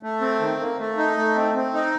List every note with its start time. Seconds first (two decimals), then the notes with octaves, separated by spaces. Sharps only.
0.03 A3
0.21 C4
0.40 D#3
0.60 A#3
0.79 A3
0.97 D#4
1.17 A3
1.36 C4
1.55 C4
1.74 D#4